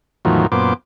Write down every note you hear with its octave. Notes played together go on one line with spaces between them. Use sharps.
E2 A2 D#3 F3 F#3
F#2 A#2 B3 C5 D6